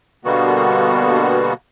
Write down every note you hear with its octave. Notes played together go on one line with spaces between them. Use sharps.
B2 D3 G3 A#3 B3 F#4